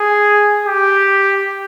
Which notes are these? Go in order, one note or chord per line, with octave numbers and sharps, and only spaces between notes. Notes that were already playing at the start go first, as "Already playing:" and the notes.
Already playing: G#4
G4